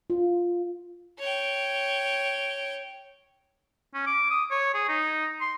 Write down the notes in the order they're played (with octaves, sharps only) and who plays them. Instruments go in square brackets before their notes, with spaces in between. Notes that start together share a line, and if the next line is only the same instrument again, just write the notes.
[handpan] F4
[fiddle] C#5 G5
[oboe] C#4
D6
D#6
C#5
G#4
D#4
C6